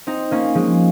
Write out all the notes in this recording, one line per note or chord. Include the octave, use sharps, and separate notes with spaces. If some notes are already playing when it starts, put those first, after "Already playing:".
C4 D#4
A#3 C#4
F3 G#3